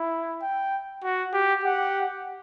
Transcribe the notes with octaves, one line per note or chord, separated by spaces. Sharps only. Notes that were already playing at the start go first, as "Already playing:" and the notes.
Already playing: E4
G5
F#4
G4
G4 F#5